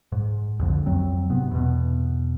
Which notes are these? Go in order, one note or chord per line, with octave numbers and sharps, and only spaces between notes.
G#2
C2 F2 D3
F2 F#3 C4
G1 G#2 C3 B3
E2 B2